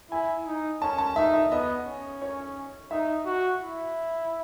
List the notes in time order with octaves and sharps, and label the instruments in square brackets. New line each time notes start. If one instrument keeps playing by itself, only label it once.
[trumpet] E4 [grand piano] G#5
[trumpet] D#4
[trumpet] C#4 [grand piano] A5
[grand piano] A5
[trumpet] D#4 [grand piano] E5
[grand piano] E5
[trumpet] B3 [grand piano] D#5
[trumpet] C#4
[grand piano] C#5
[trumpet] D#4 [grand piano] E5
[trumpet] F#4
E4